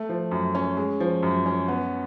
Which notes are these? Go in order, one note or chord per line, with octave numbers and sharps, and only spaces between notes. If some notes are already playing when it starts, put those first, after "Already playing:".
Already playing: A3
F3
F#2
C#4
G#3
F3
F#2
C#4
B3